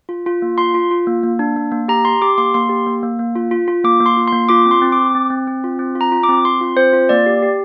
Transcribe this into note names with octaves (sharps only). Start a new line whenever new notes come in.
F4
F4
A#3
F4 C6
F4
F4
A#3
A#3
D4
A#3
A#3
G4 A#5
G4 C6
G4 D6
A#3 C6
A#3 C6
G4
A#3
A#3
A#3
F4
F4
F4
A#3 D6
A#3
C6
F4
C6
A#3
F4 D6
C4
C6
C4
D6
C4
C4
C4
C4
F4
C4
F4
A#5
F4
D6
C4
C4 C6
F4
C4 C5
F4
A#3 D5
G4
G4